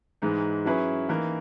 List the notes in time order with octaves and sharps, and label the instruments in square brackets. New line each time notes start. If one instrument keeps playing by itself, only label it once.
[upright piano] G#2 E3 G#3 D#4
F#3 C#4 E4 G#4 B4
E3 A#3 D#4 A#4